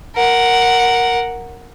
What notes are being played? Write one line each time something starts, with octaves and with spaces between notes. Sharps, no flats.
A#4 F#5